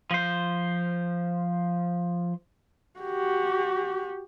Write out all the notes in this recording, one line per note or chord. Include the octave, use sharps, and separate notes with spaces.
F3 C5
F#4 G4